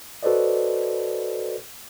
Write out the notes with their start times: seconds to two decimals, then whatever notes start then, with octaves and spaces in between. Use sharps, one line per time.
0.23 F#4 A4 B4 C5 D5 D#5